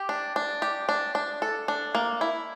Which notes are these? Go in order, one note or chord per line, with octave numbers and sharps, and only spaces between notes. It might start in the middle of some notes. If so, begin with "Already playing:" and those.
Already playing: G4
D4
D4
G4
D4
D4
A4
D4
A#3
E4